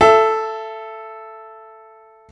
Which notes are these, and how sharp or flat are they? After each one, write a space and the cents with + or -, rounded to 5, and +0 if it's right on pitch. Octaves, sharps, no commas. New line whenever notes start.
A4 +0 E5 +25